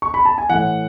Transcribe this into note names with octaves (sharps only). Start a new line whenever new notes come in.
C#6
B5
A5
G#5
A2 E3 F#5